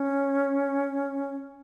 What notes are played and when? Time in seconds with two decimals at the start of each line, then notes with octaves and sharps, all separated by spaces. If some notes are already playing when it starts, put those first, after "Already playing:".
Already playing: C#4